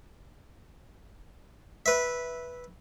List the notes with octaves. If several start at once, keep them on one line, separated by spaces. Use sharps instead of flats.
B4 E5